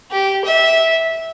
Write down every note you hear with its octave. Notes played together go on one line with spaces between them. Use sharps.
G4
E5